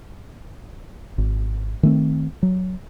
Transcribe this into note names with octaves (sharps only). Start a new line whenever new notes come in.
G#1
D#3 A3 C4
F#3